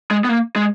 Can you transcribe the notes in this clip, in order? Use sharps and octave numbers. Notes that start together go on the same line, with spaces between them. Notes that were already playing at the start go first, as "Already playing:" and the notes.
G#3
B3
A#3
G#3